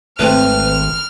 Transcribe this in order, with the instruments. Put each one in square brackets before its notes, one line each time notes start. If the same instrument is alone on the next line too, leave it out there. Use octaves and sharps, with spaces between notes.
[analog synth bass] G#1 [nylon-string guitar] A3 C4 [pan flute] B4 [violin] F6